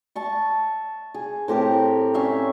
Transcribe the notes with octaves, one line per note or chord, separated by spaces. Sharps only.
E5 A5 C#6
G#4
A2 C4 G4 A#4
C#4 E5 F5